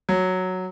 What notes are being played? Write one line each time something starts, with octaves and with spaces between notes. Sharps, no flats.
F#3